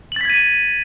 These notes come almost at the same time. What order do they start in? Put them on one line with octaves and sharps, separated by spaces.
F#7 A6 B6 G#6 D#7